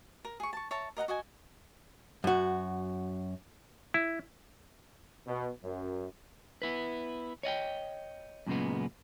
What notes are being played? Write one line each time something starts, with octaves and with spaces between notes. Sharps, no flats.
A#4
G#4 C#6
A5 C#6
C#5 E5 A5 A#5
A#4 D#5 F#5 A#5
F#4 D#5 G#5
F#2 F#4
E4
B2
F#2
B3 E4 B4
C#5 D#5 F#5 G5
F#2 A#2 C#3 G#3 B3